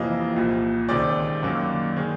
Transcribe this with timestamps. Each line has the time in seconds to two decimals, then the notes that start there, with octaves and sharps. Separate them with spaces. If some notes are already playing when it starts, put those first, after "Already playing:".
Already playing: F2 C3 E3 G3 A#3 D#5
0.36 C2 A#2 F3
0.89 C#2 C3 D#3 D5
1.43 F#2 D#3 F#3 A#3
1.96 D#3 G#3